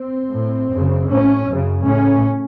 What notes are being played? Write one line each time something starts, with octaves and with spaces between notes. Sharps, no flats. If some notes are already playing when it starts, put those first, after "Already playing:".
Already playing: C4
A2
F#2 C#3
A2 C#4
F#2 C#3
A2 C#4